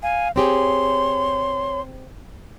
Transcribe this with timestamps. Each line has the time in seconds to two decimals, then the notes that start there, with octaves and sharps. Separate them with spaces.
0.03 F5 G#5
0.36 C4 G4 G#4 C#5 C6